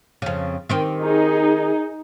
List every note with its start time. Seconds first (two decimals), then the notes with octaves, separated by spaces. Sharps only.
0.22 F2 C#3
0.69 D#3 C4 G4
1.02 D#4 G#4